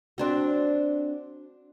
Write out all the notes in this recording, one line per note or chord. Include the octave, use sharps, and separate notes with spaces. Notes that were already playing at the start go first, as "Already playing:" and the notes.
C4 D4 F#4